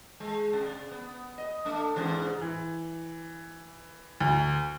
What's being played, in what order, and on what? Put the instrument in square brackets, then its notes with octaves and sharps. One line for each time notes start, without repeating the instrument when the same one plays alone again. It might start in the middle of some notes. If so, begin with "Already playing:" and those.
[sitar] G#3
C3
B3
D#5
A3 D4
G#2 C3 E3
[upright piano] E3
D2